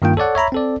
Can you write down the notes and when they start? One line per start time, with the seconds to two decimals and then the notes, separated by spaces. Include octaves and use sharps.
0.02 G2 D#3 A#3 F4 G5
0.17 A4 C#5 D5 F#5
0.35 C#5 E5 A#5 B5
0.52 C4 A4 D5